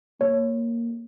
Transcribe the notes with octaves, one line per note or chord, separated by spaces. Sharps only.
A#3 C#5